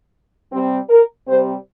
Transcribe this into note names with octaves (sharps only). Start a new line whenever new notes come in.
C3 G3 C4
A#4
C3 G3 C4 C5